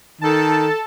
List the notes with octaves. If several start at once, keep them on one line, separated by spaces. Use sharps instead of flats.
D#3 A4 A5